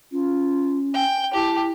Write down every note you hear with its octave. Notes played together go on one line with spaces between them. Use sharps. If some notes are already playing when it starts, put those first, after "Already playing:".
C#4 F4
G5 G#5
E4 G4 A5